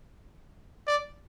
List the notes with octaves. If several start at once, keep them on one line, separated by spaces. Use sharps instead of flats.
D5